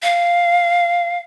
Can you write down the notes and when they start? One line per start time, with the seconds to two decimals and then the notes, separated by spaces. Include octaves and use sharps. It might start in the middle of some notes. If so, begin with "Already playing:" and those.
0.03 F5